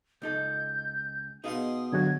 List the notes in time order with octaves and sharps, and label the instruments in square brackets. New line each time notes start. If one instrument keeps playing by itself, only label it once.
[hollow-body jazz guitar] C#2 D#4 A4 [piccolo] G6
[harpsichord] B2 C6 [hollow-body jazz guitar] D#4 G#4 F5 [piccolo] D#6
[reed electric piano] D3 F#3 F#4 [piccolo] G#6